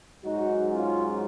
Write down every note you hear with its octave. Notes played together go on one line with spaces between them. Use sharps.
G#2 F#3 D#4 F#4
C#4 F4